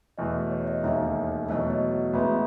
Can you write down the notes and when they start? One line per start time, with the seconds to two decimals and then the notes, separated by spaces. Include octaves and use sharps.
0.18 E2 B2 A3 D#5
0.51 C#5
0.67 D#5
0.83 E1 D#2 D#3 A3 D#4 E5
1.48 E2 B2 F#3 A3 D#5
1.59 C#5
1.70 D#5
2.13 A1 A2 G#3 B3 E4 E5